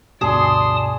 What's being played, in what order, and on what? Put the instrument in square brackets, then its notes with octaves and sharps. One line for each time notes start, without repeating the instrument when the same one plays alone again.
[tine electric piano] D2 G2 B2 [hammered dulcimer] G#4 [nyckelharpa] D5 C6 [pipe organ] A5 D#6